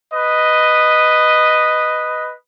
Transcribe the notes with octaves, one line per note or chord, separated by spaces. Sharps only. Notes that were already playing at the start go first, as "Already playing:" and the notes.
B4 D#5